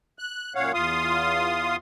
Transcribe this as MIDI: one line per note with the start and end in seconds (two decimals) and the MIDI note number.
0.19 0.53 90
0.55 0.72 42
0.55 0.72 46
0.55 0.72 73
0.55 0.72 77
0.55 0.72 78
0.74 1.76 40
0.74 1.76 65
0.74 1.76 77
0.74 1.76 84
0.74 1.76 87